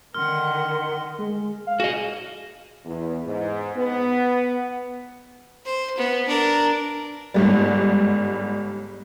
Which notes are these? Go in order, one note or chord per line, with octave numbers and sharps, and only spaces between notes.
D3 D#3 A#4 F#5 C6 F6
G#3
F5
F#4 G#4 D#5
E2
G#2
B3
C5
B3
D4 A#4
G1 G#2 G3